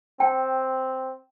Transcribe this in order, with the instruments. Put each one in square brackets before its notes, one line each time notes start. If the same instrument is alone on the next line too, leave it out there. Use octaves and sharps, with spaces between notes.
[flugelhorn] C4 [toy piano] G5